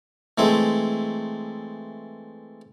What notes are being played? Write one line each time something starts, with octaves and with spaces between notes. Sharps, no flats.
E3 G#3 A3 C4